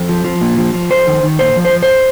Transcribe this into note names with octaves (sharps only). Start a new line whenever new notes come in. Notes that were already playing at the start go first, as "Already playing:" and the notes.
Already playing: F2
F3
F3
A#2
F3
F3
F2 C5
D#3
D#3
A#2 C5
F3
C5
F3
C5